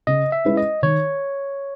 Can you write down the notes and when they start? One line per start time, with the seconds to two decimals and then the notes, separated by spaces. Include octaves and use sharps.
0.07 C#3 D#5
0.32 E5
0.45 G#3 C#4 E4 B4
0.57 D#5
0.82 D#3 C#5